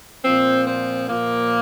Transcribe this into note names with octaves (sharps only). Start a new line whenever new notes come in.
A#2 F3 C4
C4
A#2 F3 A#3